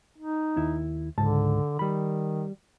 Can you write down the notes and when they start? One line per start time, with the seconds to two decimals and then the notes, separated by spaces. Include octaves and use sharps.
0.18 D#4
0.57 D#2 E4
1.18 C#2 G#2 D3 A5
1.79 D#3 G3 B5